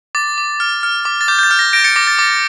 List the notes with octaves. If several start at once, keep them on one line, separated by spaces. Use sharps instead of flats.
D6 A6
D6
F6
F6
D6
A6
D6 G6
G6
A6
F6
A#6
G6 A#6 D7
A6 C#7
D6 A#6
A6
D6 A6